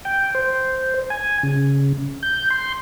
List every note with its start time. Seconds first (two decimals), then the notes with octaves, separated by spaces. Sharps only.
0.05 G5
0.35 C5
1.10 G#5
1.43 C#3
2.23 G6
2.50 C6